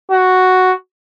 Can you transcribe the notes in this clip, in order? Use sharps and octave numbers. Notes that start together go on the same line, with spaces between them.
F#4